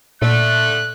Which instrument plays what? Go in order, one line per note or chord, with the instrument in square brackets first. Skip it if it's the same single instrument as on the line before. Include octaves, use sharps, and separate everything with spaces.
[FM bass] A#2 [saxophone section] D3 A3 [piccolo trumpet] F#6